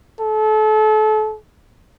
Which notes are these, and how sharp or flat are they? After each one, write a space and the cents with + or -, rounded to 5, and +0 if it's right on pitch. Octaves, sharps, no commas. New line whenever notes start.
A4 -30